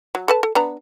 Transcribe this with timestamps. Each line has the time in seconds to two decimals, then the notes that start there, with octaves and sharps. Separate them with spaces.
0.15 F#3
0.28 A4 B4 A5
0.43 A4
0.55 B3 D4 A#5